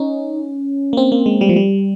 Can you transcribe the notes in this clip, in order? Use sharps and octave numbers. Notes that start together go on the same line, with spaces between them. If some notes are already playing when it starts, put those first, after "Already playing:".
Already playing: C#4 D#4
A#3
C4
A#3
G#3
G3
F3
G3